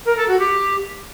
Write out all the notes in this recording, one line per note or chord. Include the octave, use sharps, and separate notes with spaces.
A#4
A4
F#4
G4